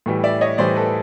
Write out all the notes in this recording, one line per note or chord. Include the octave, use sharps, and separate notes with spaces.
A2 E3 G3
D5 E5
C#5 D#5
A2 E3 G3 C5 D5
A4 B4